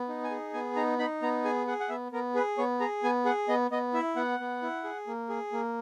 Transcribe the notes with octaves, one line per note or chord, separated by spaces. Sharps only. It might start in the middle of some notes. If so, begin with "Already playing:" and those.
Already playing: B3
D#4
G#5
G#4
B3 G#5
D#4 A#5
D#4 B5
B3 A#5
G#4 G#5
G#4 F#5
F#5
B3 E5
B3 A#4
G#4 B4
B3 C#5
G#4 A#5
B3 G#5
G#4 F#5
B3 D#5
B3 D#5
E4 E5
B3 F#5
B3
E4
G#4
A#3
G#4
A#3